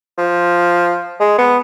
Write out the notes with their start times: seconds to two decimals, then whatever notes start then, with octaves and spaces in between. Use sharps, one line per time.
0.18 F3
1.20 G#3
1.38 B3